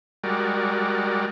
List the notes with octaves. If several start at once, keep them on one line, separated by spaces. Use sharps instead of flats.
G3 G#3 F#4 A#4 D5